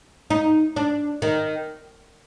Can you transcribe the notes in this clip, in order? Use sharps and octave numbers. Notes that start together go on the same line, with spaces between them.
D#4
D4
D#3